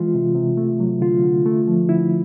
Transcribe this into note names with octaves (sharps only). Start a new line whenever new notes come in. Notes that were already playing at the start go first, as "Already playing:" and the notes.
Already playing: E3 G#3 F4
C3
C3
A3
F#3
D3 F4
D3
A3
F3
D3 E4